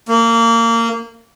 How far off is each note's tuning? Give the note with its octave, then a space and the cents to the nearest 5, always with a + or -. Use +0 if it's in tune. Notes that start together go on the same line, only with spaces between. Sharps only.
A#3 -25